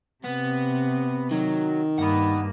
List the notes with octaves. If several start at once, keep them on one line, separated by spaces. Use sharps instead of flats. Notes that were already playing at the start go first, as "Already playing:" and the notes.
C3 B3
D#3 F#3
G2 A#3 F#5 B5